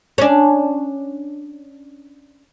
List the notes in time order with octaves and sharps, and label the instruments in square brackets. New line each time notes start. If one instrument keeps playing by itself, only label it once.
[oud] C#4 D4